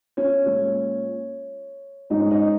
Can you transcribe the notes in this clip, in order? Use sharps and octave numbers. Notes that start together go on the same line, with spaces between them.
C#4 C#5
A#2 G#3 C#4
G#2 G#3 C#4 D#4
D#4